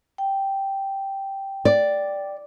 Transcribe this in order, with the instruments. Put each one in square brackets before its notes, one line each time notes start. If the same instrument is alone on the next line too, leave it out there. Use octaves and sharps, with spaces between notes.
[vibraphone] G5
[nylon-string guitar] D5